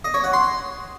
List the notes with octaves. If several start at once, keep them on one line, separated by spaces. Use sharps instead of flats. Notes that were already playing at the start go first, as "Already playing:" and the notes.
D#5
C#5
F#5
C6